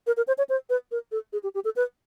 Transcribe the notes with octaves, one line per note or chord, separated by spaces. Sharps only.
A#4
A#4
C5
C#5
C5
B4
A#4
A4
G#4
G4
G4
A4
B4